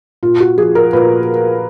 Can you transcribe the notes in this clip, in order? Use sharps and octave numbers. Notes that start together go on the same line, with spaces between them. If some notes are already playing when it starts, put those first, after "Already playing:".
A#2 F4
F#4
F3 G#4
A#4
A#2 B4